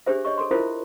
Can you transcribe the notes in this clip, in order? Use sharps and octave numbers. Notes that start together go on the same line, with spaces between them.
D4 G4 G#4 C5 E5
C#5 D#5 C#6
A4 C6
E4 F4 A4 A#4 C5 E5